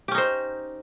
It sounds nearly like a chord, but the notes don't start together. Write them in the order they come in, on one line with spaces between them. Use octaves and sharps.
G4 C#4 D#4 C5